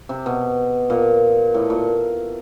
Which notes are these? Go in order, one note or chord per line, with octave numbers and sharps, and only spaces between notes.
C3
B2
A#2
A2
A#2